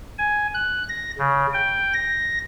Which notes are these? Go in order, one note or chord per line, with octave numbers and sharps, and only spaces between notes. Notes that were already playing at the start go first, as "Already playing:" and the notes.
G#5
F#6
A#6
C#3
G5
A#6